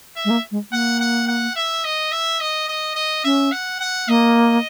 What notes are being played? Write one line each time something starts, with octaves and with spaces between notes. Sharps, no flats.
E5
G#3
A#3
G#3
A#3 F#5
F#5
F#5
E5
D#5
E5
D#5
D#5
D#5
C#4 E5
F#5
F#5
A#3 D#5